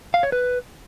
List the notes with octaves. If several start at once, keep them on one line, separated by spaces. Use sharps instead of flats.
F5
C#5
B4